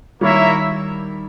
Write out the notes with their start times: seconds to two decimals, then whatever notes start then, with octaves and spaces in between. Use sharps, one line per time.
0.21 D#3 G3 A#3 E4 A#4 C#5 E5